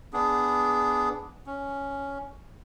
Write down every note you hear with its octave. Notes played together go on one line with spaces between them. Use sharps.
B3 D4 G#4
C#4